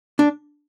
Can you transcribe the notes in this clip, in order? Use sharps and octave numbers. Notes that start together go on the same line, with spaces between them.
D4